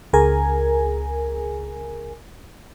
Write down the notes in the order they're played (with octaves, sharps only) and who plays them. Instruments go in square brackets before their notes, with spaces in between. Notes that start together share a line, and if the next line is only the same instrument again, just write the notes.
[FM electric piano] C#2 G#4 A#4 G#5